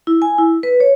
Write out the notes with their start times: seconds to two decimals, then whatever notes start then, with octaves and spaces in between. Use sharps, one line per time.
0.07 E4
0.22 G#5
0.38 E4
0.63 B4
0.80 C#5